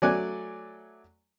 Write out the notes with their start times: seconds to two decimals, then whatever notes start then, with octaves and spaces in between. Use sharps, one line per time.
0.02 F#3 A3 D5 G#5 F#6